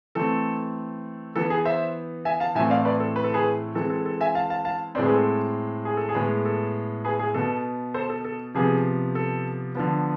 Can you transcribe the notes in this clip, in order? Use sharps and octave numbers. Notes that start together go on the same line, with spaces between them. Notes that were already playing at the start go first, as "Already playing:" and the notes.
E3 A3 C4 A4
E3 B3 A4
G#4
C5 E5
E5 G#5
F5 A5
A2 E3 A3 C4 E5 G#5
D5 F5
B4 D5
A4
B4
A4
G#4 B4
E3 G#3 C4 A4
A4
A4
E5 G#5
F5 A5
F5 A5
F5 A5
A2 G#3 C4 B4 D5
G#4 B4
A4
G#4
A4
G#4
A2 G#3 B3
A4
G#4 B4
G#4
B2 B3 A4
A4 C5
A4
A4
C3 F3 B3 G#4
A4
D3 F3 B3